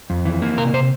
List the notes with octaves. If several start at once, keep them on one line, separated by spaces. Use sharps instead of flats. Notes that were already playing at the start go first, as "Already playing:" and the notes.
F2
E3
A#3
C3 A#4
C3 C5